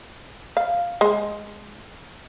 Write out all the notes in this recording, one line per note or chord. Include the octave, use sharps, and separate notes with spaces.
F5
G#3